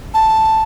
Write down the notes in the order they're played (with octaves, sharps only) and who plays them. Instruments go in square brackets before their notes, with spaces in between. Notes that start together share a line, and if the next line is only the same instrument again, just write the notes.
[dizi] A5